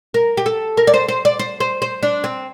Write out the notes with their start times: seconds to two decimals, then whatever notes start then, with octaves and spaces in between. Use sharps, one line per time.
0.14 A#4
0.37 G4
0.46 A4
0.77 A#4
0.87 D5
0.94 C5
1.08 C5
1.25 D5
1.39 C5
1.60 C5
1.82 C5
2.03 D4
2.24 C4